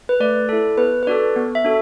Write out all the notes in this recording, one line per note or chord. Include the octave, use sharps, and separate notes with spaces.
B4
A3 D5
E4 A4
B3 B4
B4
D4 F#4 A4 D5
B3
E5
D4 F#4 A4